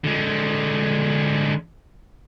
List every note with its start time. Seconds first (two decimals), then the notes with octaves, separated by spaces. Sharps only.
0.04 D3 G#3